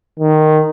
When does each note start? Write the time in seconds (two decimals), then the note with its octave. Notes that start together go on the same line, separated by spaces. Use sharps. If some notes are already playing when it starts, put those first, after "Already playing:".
0.19 D#3